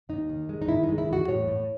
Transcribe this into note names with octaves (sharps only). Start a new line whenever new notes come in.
D#2 D#4
D#3
G#3
D#4
D#3 E4
D#4
G#3
E4
E2 F#4
A2 C#5
A2